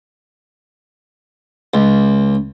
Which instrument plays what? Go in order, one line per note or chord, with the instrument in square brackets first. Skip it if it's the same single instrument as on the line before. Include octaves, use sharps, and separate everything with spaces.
[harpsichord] C#2